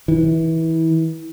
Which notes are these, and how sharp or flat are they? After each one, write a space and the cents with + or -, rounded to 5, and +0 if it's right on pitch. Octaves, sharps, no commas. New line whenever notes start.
E3 -25